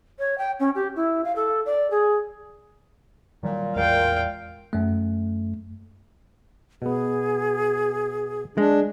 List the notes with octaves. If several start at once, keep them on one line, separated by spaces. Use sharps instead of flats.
C#5
G5
C#4
G4
E4
F5
A4
D5
G#4
A#2 D#3 F#3 G3
A1 E2 A#2 G#3 F5 G5
F#2 A3
B2 B3 G#4
G#3 D4